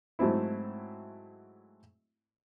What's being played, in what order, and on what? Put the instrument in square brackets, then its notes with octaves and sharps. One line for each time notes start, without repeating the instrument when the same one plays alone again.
[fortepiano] G#2 F#3 A3 C4 E4